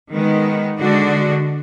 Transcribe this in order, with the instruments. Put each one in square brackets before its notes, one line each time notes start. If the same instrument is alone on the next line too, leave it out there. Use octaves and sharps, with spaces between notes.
[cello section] D#3 G#3 B3
D3 G#3 D4 F#4